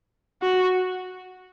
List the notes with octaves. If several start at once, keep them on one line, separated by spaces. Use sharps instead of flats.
F#4